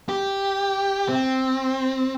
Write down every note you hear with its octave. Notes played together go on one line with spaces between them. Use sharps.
G4
C4